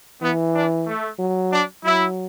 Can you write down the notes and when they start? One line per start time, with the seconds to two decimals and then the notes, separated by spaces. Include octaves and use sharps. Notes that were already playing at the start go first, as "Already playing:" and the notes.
0.22 E3 B3
0.54 D4
0.87 A3
1.19 F#3
1.52 D4
1.84 F#3 E4